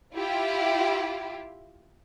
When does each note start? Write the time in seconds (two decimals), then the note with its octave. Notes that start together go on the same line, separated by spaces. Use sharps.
0.14 E4 F4 G4